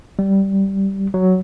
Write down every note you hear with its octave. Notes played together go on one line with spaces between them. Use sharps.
G3
F#3